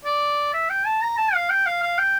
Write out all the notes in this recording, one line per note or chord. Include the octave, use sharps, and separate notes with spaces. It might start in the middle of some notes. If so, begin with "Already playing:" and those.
D5
E5
G5
A5
A#5
A5
F5
G5
F5
F5
G5